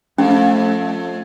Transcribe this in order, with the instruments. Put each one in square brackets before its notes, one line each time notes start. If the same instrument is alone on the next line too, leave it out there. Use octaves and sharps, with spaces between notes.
[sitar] F2 [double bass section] A3 [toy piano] C#4